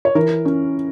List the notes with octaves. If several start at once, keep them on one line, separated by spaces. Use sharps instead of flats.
C#5
E3 A#4
C#4